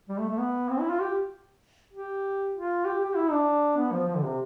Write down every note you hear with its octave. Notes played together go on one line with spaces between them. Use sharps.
G3
A3
A3
B3
C4
E4
F4
G4
G4
F4
G4
G4
E4
D4
B3
F3
F3
D3
C3